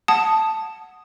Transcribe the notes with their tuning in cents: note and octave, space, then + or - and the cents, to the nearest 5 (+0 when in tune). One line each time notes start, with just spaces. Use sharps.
F#5 +0 A5 +0 D#6 -5